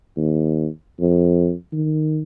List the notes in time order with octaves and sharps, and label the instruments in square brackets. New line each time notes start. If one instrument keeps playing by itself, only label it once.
[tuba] D#2
F2
D#3